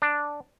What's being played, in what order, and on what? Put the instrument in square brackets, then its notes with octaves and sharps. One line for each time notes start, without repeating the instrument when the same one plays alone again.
[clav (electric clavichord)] D4